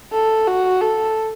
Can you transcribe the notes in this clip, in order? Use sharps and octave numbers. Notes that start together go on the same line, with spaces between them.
A4
F#4
A4